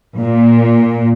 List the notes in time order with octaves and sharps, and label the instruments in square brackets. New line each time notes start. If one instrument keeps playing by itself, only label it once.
[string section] A#2